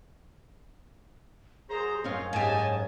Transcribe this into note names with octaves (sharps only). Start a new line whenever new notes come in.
F#2 G#4 C5 A#5
F#2 C4 C#4 D#4 F4 C#5 F5
G#2 G4 D#5 G#5 A5